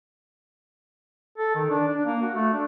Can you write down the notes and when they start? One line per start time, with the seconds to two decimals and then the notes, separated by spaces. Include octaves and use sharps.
1.38 A4
1.55 D#3
1.70 D4
1.87 D4
2.06 A#3
2.22 F#4
2.34 A3
2.53 D4